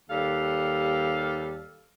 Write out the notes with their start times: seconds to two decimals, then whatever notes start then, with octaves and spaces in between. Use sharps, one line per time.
0.09 D#2 G3 A4 F5